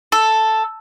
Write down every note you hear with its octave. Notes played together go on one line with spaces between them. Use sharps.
A4